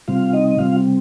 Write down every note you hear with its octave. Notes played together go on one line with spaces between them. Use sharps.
C3 G3 C4 F4 F5
D#4 D#5
C3 G3 C4 F4 F5